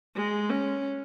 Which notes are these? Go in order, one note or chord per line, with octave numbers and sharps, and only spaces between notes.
G#3
C#4